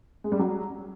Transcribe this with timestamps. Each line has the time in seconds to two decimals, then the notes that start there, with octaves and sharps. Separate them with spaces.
0.24 G#3
0.32 G3
0.39 F#3